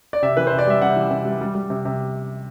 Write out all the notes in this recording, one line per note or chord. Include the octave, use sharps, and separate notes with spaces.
D5
C3 E5
E3 B4
C5
C3
D5
G3 E5
C3 F#5
E3
C3
G3
G3
G3
C3
C3